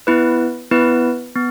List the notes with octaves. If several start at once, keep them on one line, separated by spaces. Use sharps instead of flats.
B3 E4 B4
B3 E4 B4
B3